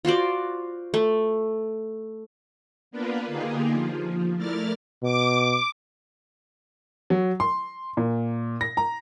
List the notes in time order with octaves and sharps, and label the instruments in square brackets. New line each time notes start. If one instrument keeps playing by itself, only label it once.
[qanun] F4 F#4 C5 D5
A3
[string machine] A#3 B3 D4 F4 A#4 B4
D3 A#3 D#4 F4 G4 G#4
F3
A3 E4 A#4 D5 F6 A6
[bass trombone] B2 [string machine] D6
[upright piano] F#3
C6
A#2
A#6
A#5